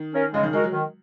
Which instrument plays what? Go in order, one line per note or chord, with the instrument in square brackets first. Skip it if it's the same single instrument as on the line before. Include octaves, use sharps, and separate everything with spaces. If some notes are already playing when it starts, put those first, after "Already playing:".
Already playing: [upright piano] D#3
[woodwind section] C#4 A#4
[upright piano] C#3 [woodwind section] G#3
[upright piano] D#3
[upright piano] G#3 [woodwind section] D#4 F#4 A#4
[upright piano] F#3
[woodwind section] D#3